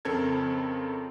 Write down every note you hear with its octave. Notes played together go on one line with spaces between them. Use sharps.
F2 C#3 C4 A4 A#4 G#6